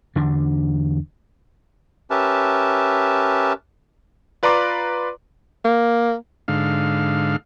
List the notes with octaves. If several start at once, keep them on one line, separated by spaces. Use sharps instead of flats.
E2 D3 D4
C#4 G4 A#4 B4 E5 A5
F4 B4 D5 A#5 C6 D6
A#3
G#2 D3 F5